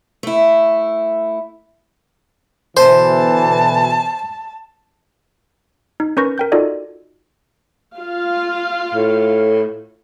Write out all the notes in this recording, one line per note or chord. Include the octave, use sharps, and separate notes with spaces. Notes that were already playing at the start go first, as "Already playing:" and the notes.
A3 E4
B2 D3 E3 C5 A5
D#4
C#4 A#4 B4 C#6 G6 A#6
A#4 G5 G6
D#4 F4 F#4 A4 D5 D#5
F4 F5
A2